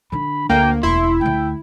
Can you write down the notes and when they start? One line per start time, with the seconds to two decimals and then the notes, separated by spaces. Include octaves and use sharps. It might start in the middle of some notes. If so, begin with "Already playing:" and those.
0.12 D3 D4 B5
0.50 D2 D3 A#3 G5
0.83 E1 E4 C6
1.21 D2 D3 G5